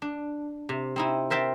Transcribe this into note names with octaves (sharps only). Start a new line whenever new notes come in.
D4
C3
C4 D#4 E4
A#4 C5 E5 G5 A5